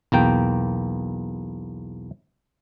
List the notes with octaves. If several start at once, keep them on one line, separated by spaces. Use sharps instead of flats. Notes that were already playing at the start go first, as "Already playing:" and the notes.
B1 E2 A#3 G5